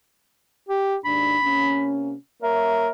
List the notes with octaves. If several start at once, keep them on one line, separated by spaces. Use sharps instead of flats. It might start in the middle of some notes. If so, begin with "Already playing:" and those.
G4
D#2 G#2 D4 B5
C3 A#3 C#4
A#3 A#4 C#5 E5